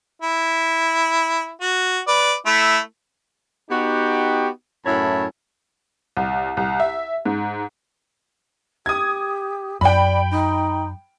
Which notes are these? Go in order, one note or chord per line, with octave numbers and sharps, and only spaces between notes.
E4
F#4
B4 D5
A3 E4
B3 D#4 F#4 G4
F#2 A2 E4 C#5 A5 B5
C2
C2
E5
G#2
G4 D#6 G#6
F#2 D5 G5 B5
D#4